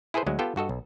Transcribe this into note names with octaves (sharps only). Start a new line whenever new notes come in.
E4 G#4 A4 B4 C5
D2 F#3 G#3
B3 F4 G4 A4 G5
G2 F#4 A4 D#5
B1